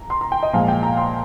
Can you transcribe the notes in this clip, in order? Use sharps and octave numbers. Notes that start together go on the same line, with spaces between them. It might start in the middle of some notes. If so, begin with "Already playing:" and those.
Already playing: A#5
C6
A#5
G5
D#5
A#2 F3 G#3 F5
G5
A#5
C6